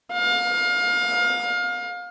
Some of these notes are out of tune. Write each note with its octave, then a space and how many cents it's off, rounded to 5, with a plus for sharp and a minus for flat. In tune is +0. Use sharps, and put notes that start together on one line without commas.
F5 +30